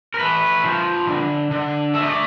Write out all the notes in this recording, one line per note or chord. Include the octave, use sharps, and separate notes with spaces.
A#4
A3 B4
F3
D3
D3
A3 E5
D#5
D5